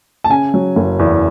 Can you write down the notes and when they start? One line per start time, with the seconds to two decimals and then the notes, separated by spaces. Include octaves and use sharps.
0.24 A5
0.29 C#3 G#5
0.54 F#3
0.76 F#1
0.99 E2